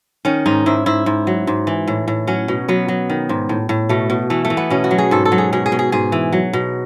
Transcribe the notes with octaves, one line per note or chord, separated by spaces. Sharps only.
D#3 C#4
G#2 D#4
G#2 E4
G#2 E4
G#2
F#3
G#2
E3
A2
A2
F#3 C#4
B2
F#3 B3
F#3
D#3
G#2
A2
A2
B2 A3
B2
E3 A3
A3
E3
B3
B2 C#4
F#4
F#3
G#4
G#2 A4
A4
F#3
G#4
B2 G#4
G#4
B2
G#4
G#2 G#4
E3
F#3
B2